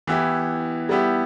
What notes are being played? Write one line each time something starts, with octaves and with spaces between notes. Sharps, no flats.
E3 B3 E4 G4
G3 B3 E4 G4